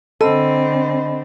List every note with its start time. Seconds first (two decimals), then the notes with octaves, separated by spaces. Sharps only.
0.21 D3 C4 A4 D#5 B5